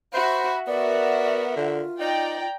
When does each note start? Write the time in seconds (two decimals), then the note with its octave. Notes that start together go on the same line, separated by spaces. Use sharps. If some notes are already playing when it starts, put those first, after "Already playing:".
0.14 F#4 C5 E5 B5
0.67 B3 F#4 A#4 D5 E5
1.56 D3 F4
2.00 D#4 D5 G5 A#5